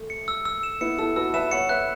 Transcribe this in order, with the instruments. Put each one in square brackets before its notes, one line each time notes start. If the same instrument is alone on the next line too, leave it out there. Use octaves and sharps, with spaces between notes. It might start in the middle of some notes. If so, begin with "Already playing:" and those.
Already playing: [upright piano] A3
[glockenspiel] C#7
E6
E6
E7
[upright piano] B3 E4 [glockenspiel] C#7
[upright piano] E4 A4 [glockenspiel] E6
[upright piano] F#4 B4 [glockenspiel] E6
[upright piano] B4 E5 [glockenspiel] E7
[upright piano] C#5 F#5 [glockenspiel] C#7
[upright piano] B4 E5 [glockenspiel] F#6